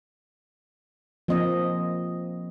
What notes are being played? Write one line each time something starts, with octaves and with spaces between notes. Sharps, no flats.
F3 A#3 C4 D#5